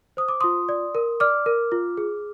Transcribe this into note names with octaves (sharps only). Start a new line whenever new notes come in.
C5 D#6
D6
F4 C6 D#6
D5
A#4
D5 D6 F6
A#4
F4
G#4